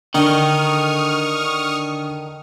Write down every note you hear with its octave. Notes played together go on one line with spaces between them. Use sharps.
D3 D#3 D4 C#6 D#6 F6